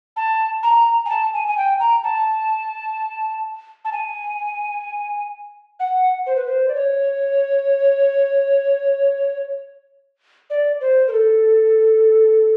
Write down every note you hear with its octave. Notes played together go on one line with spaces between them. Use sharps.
A5
A#5
G#5
A5
G#5
G#5
G5
A#5
A5
A5
G#5
F#5
C5
B4
C5
D5
C#5
D5
C5
A#4
A4